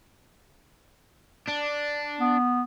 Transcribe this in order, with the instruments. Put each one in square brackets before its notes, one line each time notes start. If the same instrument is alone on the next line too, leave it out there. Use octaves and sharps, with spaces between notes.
[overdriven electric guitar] D4
[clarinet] B3